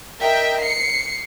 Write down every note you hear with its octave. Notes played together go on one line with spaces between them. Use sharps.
A#4 D#5 E5 G5
C7 C#7